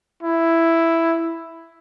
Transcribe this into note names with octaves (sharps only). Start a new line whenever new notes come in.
E4